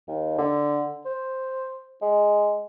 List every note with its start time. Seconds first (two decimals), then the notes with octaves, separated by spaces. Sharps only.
0.08 D#2
0.38 D3
1.05 C5
2.02 G#3